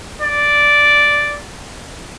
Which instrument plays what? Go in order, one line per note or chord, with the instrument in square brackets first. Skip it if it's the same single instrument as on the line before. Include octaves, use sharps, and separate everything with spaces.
[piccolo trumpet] D5